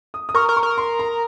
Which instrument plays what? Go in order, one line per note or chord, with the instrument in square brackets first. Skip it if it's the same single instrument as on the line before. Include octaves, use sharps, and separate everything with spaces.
[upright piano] D#6
D#6
[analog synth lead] A#4 [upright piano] C#6
[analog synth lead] A#4
[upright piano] C#6
[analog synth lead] A#4
[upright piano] C6
A#5